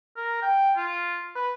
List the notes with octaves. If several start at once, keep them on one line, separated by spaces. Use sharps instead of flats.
A#4
G5
F4
B4